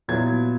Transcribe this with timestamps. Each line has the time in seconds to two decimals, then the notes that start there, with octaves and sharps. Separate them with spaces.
0.08 A#2 F#3 B3 E4 G#6